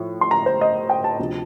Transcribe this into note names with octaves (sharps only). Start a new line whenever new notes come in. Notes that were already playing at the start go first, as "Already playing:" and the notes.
Already playing: A2 F3
C6
A#5
C5
D#5
G5
A5
D2 C3 F3